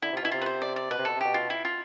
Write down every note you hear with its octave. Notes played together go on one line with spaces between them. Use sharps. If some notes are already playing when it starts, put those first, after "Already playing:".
D3 E4
C3 F4
B2 E4
C3 F4
B4
C5
D5
D5
B2 B4
C3
B2 A4
C3
B2 G4
F4
E4
F4